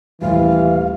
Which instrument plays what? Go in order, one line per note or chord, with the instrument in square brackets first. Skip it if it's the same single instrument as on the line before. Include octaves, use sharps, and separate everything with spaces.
[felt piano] D#1 A1 G4 [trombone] E3 [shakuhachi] F5